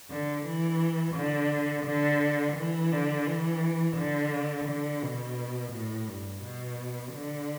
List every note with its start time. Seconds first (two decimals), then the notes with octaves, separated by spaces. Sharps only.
0.11 D3
0.46 E3
1.15 D3
1.86 D3
2.57 E3
2.92 D3
3.27 E3
3.97 D3
4.68 D3
5.03 B2
5.73 A2
6.08 G2
6.44 B2
7.14 D3